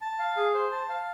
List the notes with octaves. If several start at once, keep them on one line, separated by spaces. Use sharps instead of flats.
A5
F5
G#4
C5
A5
F5